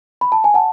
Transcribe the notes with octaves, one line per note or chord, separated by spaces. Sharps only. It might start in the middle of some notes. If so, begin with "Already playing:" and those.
B5
A5
G#5
F#5 A5